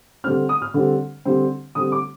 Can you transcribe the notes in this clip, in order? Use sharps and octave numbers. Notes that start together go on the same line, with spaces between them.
D3 G3 C4 F6
D#6
F6
D3 G3 C4
D3 G3 C4
D3 G3 C4 D#6
D6